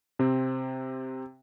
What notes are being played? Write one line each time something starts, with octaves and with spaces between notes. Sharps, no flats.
C3 C4